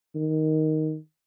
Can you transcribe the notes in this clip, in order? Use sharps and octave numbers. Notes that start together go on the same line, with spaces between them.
D#3